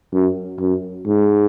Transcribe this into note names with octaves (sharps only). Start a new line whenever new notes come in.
F#2
F#2
G#2